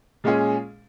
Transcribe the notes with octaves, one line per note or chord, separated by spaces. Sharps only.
A#2 G#3 C#4 G#4